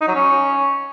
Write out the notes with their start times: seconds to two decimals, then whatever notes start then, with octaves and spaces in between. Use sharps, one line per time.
0.01 D#4
0.08 F#3
0.14 C#4